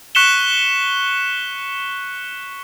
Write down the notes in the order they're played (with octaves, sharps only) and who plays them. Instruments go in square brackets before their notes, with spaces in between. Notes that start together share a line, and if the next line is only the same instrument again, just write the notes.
[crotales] C#6 F#6 B6 C#7 E7 G7